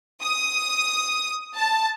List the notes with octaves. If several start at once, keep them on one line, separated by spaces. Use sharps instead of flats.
D#6
A5